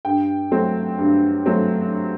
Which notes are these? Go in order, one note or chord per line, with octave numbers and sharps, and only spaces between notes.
G2 G5
F#3 A3 C4
G2
F#3 A3 C4